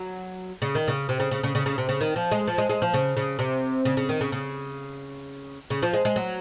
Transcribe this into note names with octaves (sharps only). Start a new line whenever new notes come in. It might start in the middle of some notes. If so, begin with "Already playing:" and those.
Already playing: F#3
C#3
D#3
C#3
C3
C#3
C#3
C#3
C#3
C#3
C3
C#3
D#3
F3
G#3
F3
G#3
G#3
F3
C#3
C#3
C3
C#3
C#3
D#3
C#3
C#3
C#3
F3
G#3
G#3
F#3